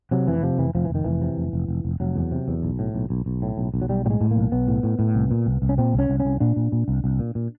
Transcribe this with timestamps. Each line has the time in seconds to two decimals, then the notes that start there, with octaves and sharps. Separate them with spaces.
0.11 C3 F#3
0.27 F1 E3
0.43 C3 F3
0.58 F1 E3
0.75 F1 F3
0.85 E3
0.90 F1
0.95 D#3
1.04 F1 E3
1.22 C3
1.37 F1
1.53 F1
1.68 F1
1.85 F1
2.00 F1 F#3
2.16 E2
2.32 C3
2.48 E2
2.63 B1
2.79 A2
2.94 B1
3.10 B1
3.26 B1
3.42 A2
3.58 B1
3.74 B1
3.82 F#3
3.89 B1 G3
4.05 A2 G3
4.10 G#3
4.21 A2
4.31 A#3
4.36 B1
4.52 B1 B3
4.68 A2
4.83 A2
4.99 A2
5.15 C2
5.31 A#2
5.46 C2
5.62 C2
5.69 C#4
5.78 A#2 C4
5.93 C2
5.99 C#4
6.09 C2
6.20 C#4
6.25 C2
6.40 A#2 D4
6.56 A#2
6.72 A#2
6.88 C2
7.04 C2
7.19 A#2
7.35 A#2